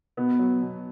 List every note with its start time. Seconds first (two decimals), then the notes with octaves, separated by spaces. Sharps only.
0.17 B2 B3
0.39 F#3
0.62 B2